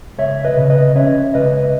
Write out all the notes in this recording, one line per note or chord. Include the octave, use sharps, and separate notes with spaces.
C#2 C#5 E5
B4 D#5
C#3
B4 D#5
C#4 C#5 E5
C#2 B4 D#5